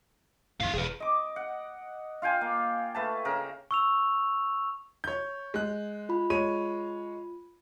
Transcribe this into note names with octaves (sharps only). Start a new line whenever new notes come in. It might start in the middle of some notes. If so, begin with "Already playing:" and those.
D2 G#2 E4 F5
E1 G#4 B4
D#5 D6
F#5
F4 F5 G5 G#5
A#3
A3 B4 A5
C#3 A#4
C#6 E6 F7
C#5 G6
G#3 F#6
F4 B5
G#3 C#5 D#7